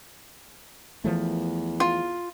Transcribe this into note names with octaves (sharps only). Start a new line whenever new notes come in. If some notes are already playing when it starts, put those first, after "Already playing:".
E2 E3 F3 A3
F4